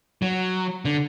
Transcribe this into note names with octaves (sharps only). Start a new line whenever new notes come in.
F#3
D3